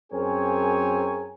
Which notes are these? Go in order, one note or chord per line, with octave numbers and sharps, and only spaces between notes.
F#2 C4 G#4 A#4 C#5 G#5